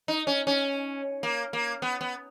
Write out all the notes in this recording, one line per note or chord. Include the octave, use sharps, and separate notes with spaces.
D#4
C#4
C#4
A#3
A#3
B3
B3